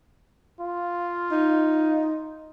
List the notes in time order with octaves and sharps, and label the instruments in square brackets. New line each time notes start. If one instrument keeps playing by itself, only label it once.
[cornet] F4
[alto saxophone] D#4